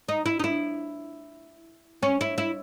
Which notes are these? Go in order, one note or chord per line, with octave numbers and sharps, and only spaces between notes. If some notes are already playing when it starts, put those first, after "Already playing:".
D#4
E4
D#4
E4
C#4
E4
E4